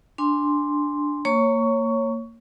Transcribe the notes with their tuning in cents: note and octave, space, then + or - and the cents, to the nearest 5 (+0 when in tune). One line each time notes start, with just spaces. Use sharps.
D4 +0 G#5 -15 C6 +0
A#3 -20 C#5 -5 C#6 +15